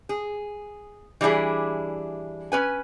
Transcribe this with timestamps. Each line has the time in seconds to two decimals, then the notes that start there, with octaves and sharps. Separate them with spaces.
0.09 G#4
1.21 E3 G3 D4 E4 G#4
2.52 C#4 B4 G#5